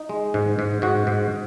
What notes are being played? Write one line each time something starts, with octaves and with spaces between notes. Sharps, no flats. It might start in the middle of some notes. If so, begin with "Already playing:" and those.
Already playing: D#4
G#3
G#2
G#2
G#2 F#4
G#2